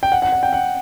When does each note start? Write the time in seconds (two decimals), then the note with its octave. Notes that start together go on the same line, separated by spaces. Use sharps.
0.03 G5
0.12 F#5
0.22 F#5
0.32 F#5
0.43 G5
0.53 F#5